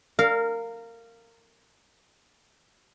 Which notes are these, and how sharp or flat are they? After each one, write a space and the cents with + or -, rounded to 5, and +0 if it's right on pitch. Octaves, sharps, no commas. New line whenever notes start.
A#4 -20 F5 +0